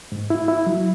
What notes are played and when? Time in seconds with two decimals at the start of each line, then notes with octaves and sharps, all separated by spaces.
0.12 G#2
0.30 E4
0.48 E4
0.66 F#3